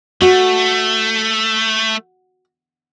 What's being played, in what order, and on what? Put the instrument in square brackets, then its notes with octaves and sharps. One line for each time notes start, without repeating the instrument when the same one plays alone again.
[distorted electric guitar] A3 [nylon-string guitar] F#4